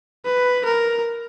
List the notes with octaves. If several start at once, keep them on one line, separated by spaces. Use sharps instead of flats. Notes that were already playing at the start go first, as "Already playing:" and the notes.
B4
A#4